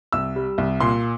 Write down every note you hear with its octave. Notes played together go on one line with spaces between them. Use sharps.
C2 E6
G3
C2
A#2 C6